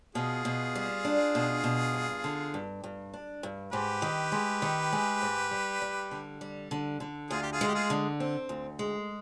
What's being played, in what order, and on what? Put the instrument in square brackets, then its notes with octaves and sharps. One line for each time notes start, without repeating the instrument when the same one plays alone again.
[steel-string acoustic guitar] B2 [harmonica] F4 G#4
[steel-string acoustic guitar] B2
G3
D4
B2
B2
G2
D3
G2
G2
D4
G2
[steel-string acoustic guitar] G#2 [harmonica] G4 B4
[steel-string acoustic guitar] D#3
G#3
D#3
G#3
G#2
G3
G3
D3
G3
D3
D3
[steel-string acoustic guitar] D2 [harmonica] F4 G#4
[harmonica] G4
F4 G#4
[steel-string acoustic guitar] G#3
[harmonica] G4
F4 G#4
[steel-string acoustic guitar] D3
C4
D2
G#3